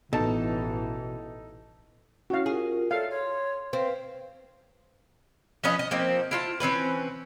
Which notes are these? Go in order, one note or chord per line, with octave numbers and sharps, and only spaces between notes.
A1 B2 E3 D#4 A4 A5
C#4 E4 F#4 C#5 F5
F4 G4 G#4 A#4
A4 C#5 D5 E5 F5
C#5 C6
C4 B4 F5
F3 B3 C#4 D#5
D#5
F3 A#3 C4 D#4
E4 F4 A5
E3 C4 C#4 B4